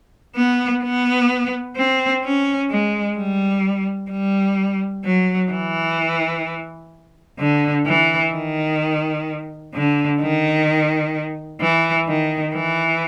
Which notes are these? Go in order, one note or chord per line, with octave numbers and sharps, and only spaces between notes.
B3
B3
C4
C#4
G#3
G3
G3
F#3
E3
D3
E3
D#3
D3
D#3
E3
D#3
E3